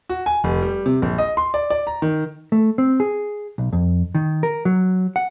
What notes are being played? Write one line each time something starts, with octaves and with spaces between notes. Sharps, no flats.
F#4
G#5
F1
G3
C3
A#1
D#5
C6
D5
D5
A#5
D#3
A3
C4
G#4
B1
F2
D#3
A#4
F#3
F#5